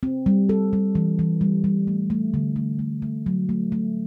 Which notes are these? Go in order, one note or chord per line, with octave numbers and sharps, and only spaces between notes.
C4
G3
A4
G3
E3
E3
G3
G3
A3
A3
D3
A3
A3
A3
F#3
A3
A3